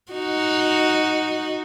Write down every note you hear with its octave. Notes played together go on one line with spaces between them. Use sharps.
D#4 F#4